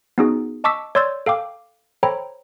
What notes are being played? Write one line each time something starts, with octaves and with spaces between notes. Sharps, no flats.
B3 C#4 D#4 F#4 G#4
D#5 A5 C#6 D6 E6 B6
C#5 D5 C6 E6 G6 A6
A4 F5 G5 D6
A4 C5 C#5 G5 A#5 B5